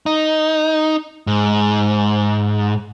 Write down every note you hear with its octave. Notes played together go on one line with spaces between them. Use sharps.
D#4
G#2